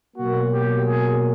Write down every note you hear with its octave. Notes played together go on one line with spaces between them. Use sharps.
B2 F#3 A#3 F#4
G4
G#4